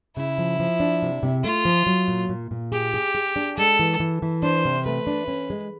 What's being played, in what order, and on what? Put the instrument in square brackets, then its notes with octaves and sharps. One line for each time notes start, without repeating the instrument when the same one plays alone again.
[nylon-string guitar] C#3 [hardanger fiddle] E4
[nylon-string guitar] F3
F3
D4
C3
C3
[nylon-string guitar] A3 [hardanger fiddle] F4
[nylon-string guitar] F3
F#3
A#2
A#2
A#2
[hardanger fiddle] G4 [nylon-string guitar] G#4
[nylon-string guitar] G#4
G#4
D4
[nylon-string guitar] G#3 [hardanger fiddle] A4
[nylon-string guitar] E3
E3
E3
[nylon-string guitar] D4 [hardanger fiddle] C5
[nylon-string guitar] C3
[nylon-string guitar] A3 [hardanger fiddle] B4
[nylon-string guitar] D4
C#4
G#3